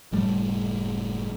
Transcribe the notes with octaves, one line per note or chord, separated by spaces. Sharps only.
F#1 A2 G3 A3